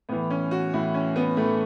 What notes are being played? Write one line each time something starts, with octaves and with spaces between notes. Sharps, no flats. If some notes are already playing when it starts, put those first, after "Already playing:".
A2 E3 B3
C#4
F#4
A2 E3 E4
C#4
B3
A2 E3 A3